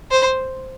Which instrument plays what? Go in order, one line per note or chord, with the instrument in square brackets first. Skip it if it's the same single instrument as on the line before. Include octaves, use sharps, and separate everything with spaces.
[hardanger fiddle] C5